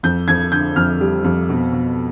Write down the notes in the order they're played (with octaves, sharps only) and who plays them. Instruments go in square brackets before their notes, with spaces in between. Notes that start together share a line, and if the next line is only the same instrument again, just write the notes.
[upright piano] F2 G6
F2 G#6
D3 G6
F2 F6
G3
F2
B2
B2